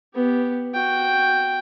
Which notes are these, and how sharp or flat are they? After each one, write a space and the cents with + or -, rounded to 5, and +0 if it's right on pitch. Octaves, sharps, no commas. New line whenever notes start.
B3 +0 G4 +0
F#4 +0 G5 +0